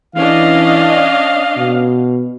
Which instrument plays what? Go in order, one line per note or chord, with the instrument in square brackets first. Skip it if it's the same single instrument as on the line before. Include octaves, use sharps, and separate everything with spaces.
[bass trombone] E3 [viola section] C#4 D4 D#5 [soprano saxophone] F5
[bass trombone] B2